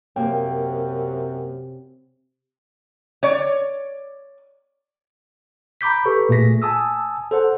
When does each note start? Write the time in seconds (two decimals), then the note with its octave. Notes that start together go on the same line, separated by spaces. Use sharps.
0.16 F#2 C3 A#3 G5
3.23 C#5 D5
5.81 A#5 B5 D6 G6 B6
6.05 G4 A4 B4 C#6
6.29 A#2 A3 G#4 A#6 B6
6.62 G#5 A5 D#6 E6
7.31 A4 C5 F#5